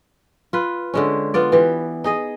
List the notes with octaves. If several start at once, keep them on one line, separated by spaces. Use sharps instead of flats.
F4 B4
D3 G#3 C#4
B3 F4 D5
E3 G4
D#4 G#4 D#5